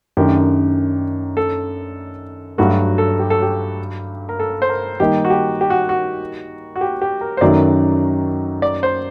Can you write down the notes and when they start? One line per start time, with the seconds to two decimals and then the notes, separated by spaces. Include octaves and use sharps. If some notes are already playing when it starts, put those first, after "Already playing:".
0.17 F#2 D#3 A3 D4 G4
1.37 A4
2.58 G2 F#3 A3 F#4
2.98 A4
3.19 G4
3.30 A4
3.42 G4
4.29 A#4
4.40 A4
4.62 C5
4.69 A#4
5.00 D#3 G3 A#3 D#4 G4
5.25 F#4
5.30 G4
5.61 G4
5.70 F#4
5.89 F#4
6.76 F#4
6.81 G4
7.02 G4
7.21 A#4
7.37 C5
7.41 F#2 D#3 F#3 A3 D5
8.62 D5
8.83 C5